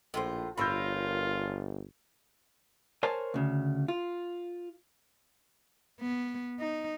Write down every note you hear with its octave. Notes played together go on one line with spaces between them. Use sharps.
A#1 A2 F4 C5
G1 F4 A#4 C#5 B5 E6 G6
A#4 C5 C#5 G#5 A5
D2 C#3
F4
B3
D#4